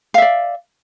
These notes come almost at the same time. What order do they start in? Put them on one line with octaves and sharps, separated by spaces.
F5 E5 D5